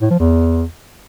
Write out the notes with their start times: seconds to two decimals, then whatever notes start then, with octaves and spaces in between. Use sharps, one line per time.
0.01 A2
0.10 F3
0.19 E2